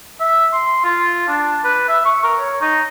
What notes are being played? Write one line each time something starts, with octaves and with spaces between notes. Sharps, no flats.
E5
C6
F4
D4
B4
E5
C#6
A#4
C#5
D#4